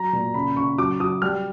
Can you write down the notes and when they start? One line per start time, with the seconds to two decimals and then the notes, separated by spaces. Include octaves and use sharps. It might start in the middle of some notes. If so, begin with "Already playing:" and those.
Already playing: F#3 A#5
0.13 A#2
0.34 C#3 B5
0.57 C#3 C#6
0.78 F#3 D6
1.00 F#3 D#6
1.22 G3 F6